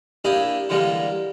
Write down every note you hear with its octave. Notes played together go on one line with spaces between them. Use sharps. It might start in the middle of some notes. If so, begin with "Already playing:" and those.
A#3 D4 E4 G4 G#4
D3 E3 G3 G#3 A#3